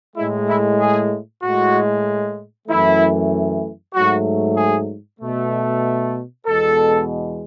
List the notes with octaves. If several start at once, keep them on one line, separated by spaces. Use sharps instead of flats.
A2 G#3 E4
E4
G#4
A2 G#3 F#4
F#2 E3 A3 E4
G#2 F#3 A3 F#4
G#4
B2 A3
E2 B2 G#3 A4